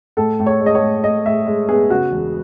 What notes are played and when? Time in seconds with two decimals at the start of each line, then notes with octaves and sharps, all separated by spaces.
0.17 A2 A4
0.39 A2
0.46 C#5
0.60 G#3
0.66 D#5
0.75 C#5
0.83 A2
1.04 A2 D#5
1.26 A2 E5
1.47 G#3
1.68 B3 G#4
1.89 C#3 F#4
2.12 E1